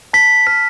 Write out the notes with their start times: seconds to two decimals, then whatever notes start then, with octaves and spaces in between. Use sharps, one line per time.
0.13 A5 B6
0.47 F6 B6